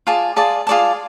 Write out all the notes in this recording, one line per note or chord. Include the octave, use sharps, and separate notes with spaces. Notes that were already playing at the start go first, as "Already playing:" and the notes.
F4 G#4 D5 A5
F4 G#4 D5 A5
F4 G#4 D5 A5